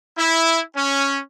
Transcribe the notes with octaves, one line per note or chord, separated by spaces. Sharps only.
E4
C#4